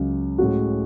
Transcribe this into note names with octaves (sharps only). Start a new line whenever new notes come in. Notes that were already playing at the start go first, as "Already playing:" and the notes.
Already playing: C#2 C#3 F#3 C#4
A2 G#3 C#4 F#4